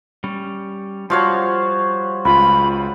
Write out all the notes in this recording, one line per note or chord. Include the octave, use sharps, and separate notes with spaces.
G3 C#4
F3 G3 F#4 C#5 F5
C#2 F4 B5